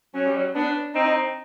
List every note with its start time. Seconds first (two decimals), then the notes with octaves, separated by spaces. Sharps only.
0.14 F#3 C#4
0.25 G3
0.37 F#3
0.55 B3 D4
0.95 C4 D#4